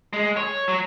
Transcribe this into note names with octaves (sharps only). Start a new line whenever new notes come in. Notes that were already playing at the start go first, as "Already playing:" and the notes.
G#3
C#5
F#3